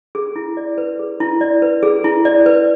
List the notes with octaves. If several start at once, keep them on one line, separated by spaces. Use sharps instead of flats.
G#4
E4
D5
B4
G#4
E4
D5
B4
G#4
E4
D5
B4